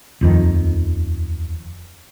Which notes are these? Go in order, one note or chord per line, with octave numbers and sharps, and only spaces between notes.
D#1 F2 D#3